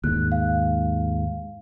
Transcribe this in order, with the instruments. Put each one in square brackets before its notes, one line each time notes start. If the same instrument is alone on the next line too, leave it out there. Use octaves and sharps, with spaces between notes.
[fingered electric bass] D#2 G#2 [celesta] F#6
[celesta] F5